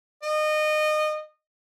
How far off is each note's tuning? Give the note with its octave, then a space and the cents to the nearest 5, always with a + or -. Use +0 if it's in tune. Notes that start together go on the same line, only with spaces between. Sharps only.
D#5 -25